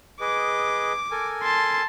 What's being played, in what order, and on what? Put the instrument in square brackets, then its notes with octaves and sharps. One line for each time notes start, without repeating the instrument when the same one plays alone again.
[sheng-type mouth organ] G#4 B4 D#5 [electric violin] D6
[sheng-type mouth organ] A4 A#4 G#5
[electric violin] A5 C6